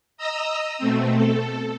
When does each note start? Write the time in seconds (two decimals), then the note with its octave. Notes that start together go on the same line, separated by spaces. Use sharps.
0.17 D#5 A#5 D#6 E6
0.78 B2 A3 C4
1.15 A4